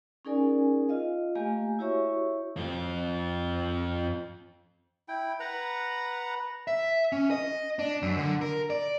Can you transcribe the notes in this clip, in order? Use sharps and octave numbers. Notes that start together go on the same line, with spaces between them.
C#4 D#4 G#4 A#4 D5 G#5
F4 D#5 F5
A3 A#3 G4 F5 G#5
E4 F#4 G4 C#5 E5 C#6
F2 F4
E4 G5
B4 F#5 A#5
E5
C#4
D#5
D4
F#2
D3
A#4
D5